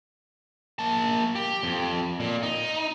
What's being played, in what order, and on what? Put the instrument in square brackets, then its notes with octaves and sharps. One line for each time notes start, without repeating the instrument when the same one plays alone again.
[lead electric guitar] A#3 A5
G4
F2
A#2
D#4